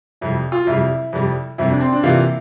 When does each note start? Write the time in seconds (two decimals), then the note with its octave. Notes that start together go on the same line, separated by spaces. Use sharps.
0.21 F2 C3 G3 E4
0.52 F4
0.67 F2 C3 G3 E4
1.13 F2 C3 G3
1.58 F2 C3 G3 E4
1.70 D4
1.81 C4
1.92 D4
2.03 C3 E3 A#3 E4 F4